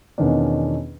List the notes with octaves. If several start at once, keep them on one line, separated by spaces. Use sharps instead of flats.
E2 B2 D#3 C#4 D4